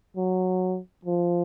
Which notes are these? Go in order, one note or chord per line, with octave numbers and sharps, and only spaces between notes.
F#3
F3